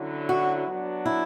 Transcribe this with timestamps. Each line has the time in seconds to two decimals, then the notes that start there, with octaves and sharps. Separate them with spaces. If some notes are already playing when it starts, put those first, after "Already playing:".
Already playing: D3 F#3 C#4 E4
0.29 F#4
0.67 F#3 B3 D4 F#4
1.06 E4